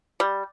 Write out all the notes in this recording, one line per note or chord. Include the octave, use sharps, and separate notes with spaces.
G3